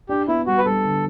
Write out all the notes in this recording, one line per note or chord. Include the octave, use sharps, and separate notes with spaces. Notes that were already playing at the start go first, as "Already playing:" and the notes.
D4 G4
B3 E4
G3 F#4
B4
G3 A4
D3